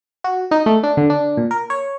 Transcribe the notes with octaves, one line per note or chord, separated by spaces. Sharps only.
F#4
D#4
A3
D4
D3
D4
A#2
A#4
C#5